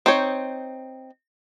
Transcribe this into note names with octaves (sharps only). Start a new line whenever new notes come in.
C4 D#4 C5 C#5